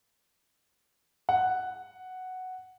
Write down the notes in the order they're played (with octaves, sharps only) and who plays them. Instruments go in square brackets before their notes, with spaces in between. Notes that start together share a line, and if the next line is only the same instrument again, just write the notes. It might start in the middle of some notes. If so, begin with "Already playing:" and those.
[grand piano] F#5